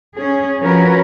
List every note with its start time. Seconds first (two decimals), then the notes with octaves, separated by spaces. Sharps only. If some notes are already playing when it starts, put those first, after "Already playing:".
0.16 C#4 G#4
0.61 F3 C#4 F#4 A#4 B4 C#5